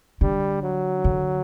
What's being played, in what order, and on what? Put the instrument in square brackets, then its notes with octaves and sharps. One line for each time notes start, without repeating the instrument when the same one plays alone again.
[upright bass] D3 [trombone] G3
[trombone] F#3
[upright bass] D3